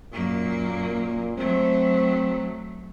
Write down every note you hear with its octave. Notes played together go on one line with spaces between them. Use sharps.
F#2 A#2 A#3
F#3 A3 C4